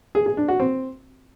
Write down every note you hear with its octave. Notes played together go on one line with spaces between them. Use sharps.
G#4
G#4
D4
F#4
C4